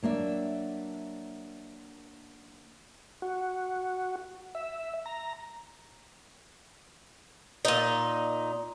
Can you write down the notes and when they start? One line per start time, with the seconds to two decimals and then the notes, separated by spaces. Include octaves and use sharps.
0.03 F#3 A#3 D4 E5
3.22 F#4
4.55 E5
5.06 A#5
7.65 A#2 D#4